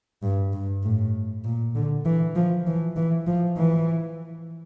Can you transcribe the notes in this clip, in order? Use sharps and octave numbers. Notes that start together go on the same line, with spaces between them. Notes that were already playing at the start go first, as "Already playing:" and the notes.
G2
G2
A2
A#2
D3
E3
F3
E3
E3
F3
E3